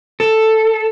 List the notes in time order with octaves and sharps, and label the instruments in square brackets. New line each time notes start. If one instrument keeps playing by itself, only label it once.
[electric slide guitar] A4